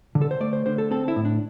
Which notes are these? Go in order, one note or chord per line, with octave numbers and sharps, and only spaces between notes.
D3
A4
C5
A3 D5
C5
D3 C5
A4
C4 A4
E4
A2
D4